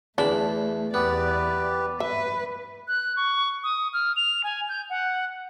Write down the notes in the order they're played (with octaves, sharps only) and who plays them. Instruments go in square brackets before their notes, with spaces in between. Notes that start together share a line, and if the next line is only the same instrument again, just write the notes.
[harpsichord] E2 B5 [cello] A3 [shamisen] D4
[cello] E2 D5 [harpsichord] B3 [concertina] G4 B4
[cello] B4 [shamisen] E5
[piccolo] F#6
C#6
D#6
F6
F7
G#5
G6
F#5